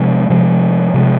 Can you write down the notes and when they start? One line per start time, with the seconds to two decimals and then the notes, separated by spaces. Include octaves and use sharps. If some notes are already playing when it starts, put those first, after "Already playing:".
Already playing: C3 F3 G#3
0.30 C3 F3 G#3
0.94 C3 F3 G#3